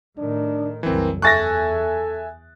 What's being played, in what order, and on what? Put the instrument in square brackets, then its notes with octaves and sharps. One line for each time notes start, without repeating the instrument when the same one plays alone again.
[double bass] A2 D#3 [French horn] D4
[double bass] F#1 C2 [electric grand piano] E3 C4 [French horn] A#4
[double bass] E2 [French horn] A4 [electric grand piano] E5 G#5 F#6 [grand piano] C#6 A6 A#6